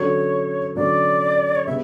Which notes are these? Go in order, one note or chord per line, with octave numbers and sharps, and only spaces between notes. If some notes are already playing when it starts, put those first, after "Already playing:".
Already playing: D3 F#3 C#4 C#5
D3 F#3 C#4 D5
C#5
C#3 G3 B3 E5